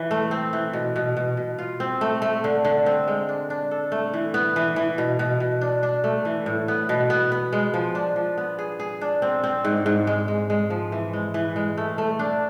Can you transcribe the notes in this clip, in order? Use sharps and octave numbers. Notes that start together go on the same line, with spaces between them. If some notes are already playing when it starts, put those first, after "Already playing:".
Already playing: E3
A3
C4
E3
B2
B2
B2
B2
F4
C4
A3
A3
D3
D3
C4
G#3
D4
D4
A4
A3
E3
B3
E3
E3
B2
B2
B2
D4
D4
A3
E3
A2
B3
B2
B3
B3
G#3
F3
D4
F3
B3
G#4
G#4
D4
C4
C4
G#2
G#2
G#3
G#3
G#3
F3
E3
G#3
E3
G#3
A3
A3
D4